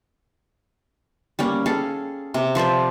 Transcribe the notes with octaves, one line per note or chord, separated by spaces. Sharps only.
G3 A#3 C#4
G#4 A4 F5
C3
F3 C5 D5 E5